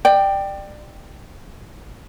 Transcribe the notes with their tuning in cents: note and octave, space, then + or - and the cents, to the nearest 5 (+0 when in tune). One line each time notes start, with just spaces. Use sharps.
D5 +25 G5 +0